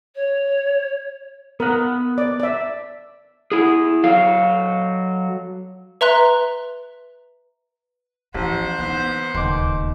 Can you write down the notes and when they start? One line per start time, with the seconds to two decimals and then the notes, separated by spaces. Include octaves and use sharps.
0.15 C#5
1.60 B3 A#4 F#5
2.18 D5
2.40 D5 E5
3.52 E4 G#4
4.04 F#3 A4 F5
6.01 B4 E5 A#5 C6 F#6
8.34 A1 F3 B3 C5 F#5
8.79 E3 B3 D#4
9.34 D1 D#2 C#3 C6 D6